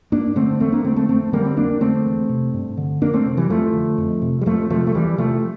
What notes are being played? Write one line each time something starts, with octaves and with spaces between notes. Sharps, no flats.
G2 A#3 D4
D3 A3 C4
E2 A3 C4
A#3 D4
D3 A3 C4
A3 C4
F2 A3 C4
D3 G3 A#3
C4
F2 A#3 D4
D3 A3 C4
E2
C3
G2
D3
F2 A#3 D4
A3 C4
C3
E3 G3
F2 F3 A3
D3
F2
C3
G3
F2 F3 A3
C3 F3 A3
A3
E2 E3 G3
C3 F3 A3